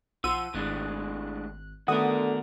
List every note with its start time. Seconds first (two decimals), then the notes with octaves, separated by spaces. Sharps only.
0.24 B1 F3 F#5 C6 E6 D#7
0.54 G#1 A2 G#3 D4 F#6
1.88 D3 D#3 A3 B3 F#4 A#4 F#5 D#6